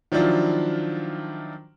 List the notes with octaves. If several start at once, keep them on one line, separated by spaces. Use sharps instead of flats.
D#3 F3 F#3 D4 E4 F4